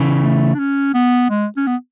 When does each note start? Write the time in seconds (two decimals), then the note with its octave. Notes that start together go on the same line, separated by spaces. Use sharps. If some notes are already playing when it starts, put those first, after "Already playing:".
Already playing: C#3 E3
0.22 A3
0.54 D4
0.59 C#4
0.94 B3
1.30 G#3
1.56 C#4
1.67 B3